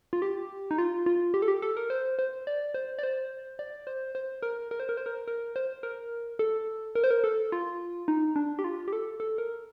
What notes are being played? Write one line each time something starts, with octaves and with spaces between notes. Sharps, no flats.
F4
G4
D#4
F4
F4
G4
A4
G4
A4
A#4
C5
C5
D5
C5
D5
C5
D5
C5
C5
A#4
A#4
C5
A#4
C5
A#4
A#4
C5
A#4
A4
A#4
C5
A#4
A4
F4
D#4
D4
G4
F4
G4
A4
A4
A#4